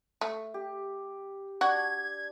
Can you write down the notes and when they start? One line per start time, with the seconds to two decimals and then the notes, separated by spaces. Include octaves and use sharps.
0.21 A3
0.54 G4
1.61 D4 F#4 G#6